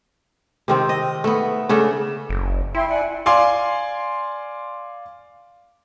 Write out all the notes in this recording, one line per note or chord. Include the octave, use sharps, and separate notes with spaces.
C3 D#3 C4
D#5
A3 B3
C#3 A3 D4 A4
F#1
E4 E5 G5 C6
D5 F#5 G#5
D5 F5 G#5 C6